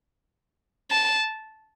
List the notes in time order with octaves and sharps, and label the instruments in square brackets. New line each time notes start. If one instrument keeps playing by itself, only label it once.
[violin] A5